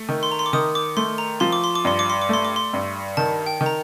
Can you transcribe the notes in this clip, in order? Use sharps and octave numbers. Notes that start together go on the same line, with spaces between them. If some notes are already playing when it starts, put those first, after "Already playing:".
Already playing: A3
D#3
C6
A#5
C6
D6
D#3 D#6
D6
A3 C6
A#5
F3 C6
D6
C6
D6
G2 C6
D6
C6
D6
A3 C6
D6
C6
G2
D#3 A5
G5
D#3
A#5